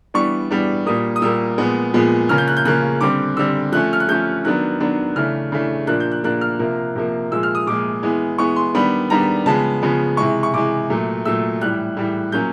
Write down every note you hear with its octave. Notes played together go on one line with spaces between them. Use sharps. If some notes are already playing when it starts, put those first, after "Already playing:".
E3 G3 B3 D4 C#6
E3 G3 B3 D4
A#2 G3 A#3 D#6
D#6
A#2 G3 A#3 E6
A#2 F3 G#3 B3
A#2 F3 G#3 B3
C#3 F3 A#3 C#4 F6
G6
F#6
G6
C#3 F3 A#3 C#4 F#6
D3 G3 C4 D6
D3 G3 C4 E6
F3 A3 C#4 F#6
F6
F#6
F3 A3 C#4 G6
D#3 F#3 B3 D4 F#6
D#3 F#3 B3 D4
C#3 E3 A3 D4 F6
C#3 E3 A3 D4
A#2 F3 A#3 D4 F#6
G6
F#6
A#2 F3 A#3 D4 F#6
F6
C3 F3 A#3
C3 F3 A#3
A#2 F3 G#3 E6
F6
D#6
A#2 F3 G#3 D6
E3 G#3 B3
E3 G#3 B3 C#6
C6
D#3 G3 B3 D4 B5
D#3 G3 B3 D4 A#5
C#3 F3 G#3 B3 A5
C#3 F3 G#3 B3
C3 E3 G#3 C#6
C#6
C3 E3 G#3 D6
A#2 F#3 A3
A#2 F#3 A3 E6
A2 E3 G3 F#6
A2 E3 G3
A#2 F#3 A#3 C#4 G6